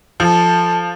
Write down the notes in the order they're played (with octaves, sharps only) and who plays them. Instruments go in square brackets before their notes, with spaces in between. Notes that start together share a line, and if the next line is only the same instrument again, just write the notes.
[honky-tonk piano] F3 [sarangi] A4